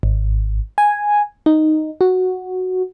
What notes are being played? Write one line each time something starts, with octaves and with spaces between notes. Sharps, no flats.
G#1
G#5
D#4
F#4